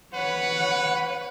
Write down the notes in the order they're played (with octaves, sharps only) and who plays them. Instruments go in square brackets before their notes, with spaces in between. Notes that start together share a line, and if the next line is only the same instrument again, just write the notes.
[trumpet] B4 [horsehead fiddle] C#5 F#5